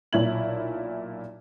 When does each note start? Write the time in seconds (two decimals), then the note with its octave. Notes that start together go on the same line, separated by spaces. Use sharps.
0.13 B1 A#2 E4 C#5 G#6 F#7